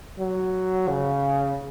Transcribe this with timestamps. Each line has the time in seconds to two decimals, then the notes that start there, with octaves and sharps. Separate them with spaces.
0.18 F#3
0.88 C#3